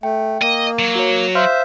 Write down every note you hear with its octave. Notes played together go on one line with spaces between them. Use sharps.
A3 G5
A#3 D#5
F#3
F#4 C#5
C5 E5 F5 C6 F6